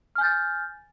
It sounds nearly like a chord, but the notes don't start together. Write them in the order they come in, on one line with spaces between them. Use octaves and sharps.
F6 G#5 G6 A6